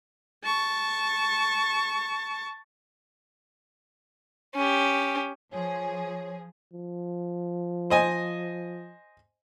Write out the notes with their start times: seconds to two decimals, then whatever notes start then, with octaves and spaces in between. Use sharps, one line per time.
0.43 A5 C#6
4.55 C#4 G4
5.52 F3 G#4 C#5
6.73 F3
7.90 C5 D#5 G#5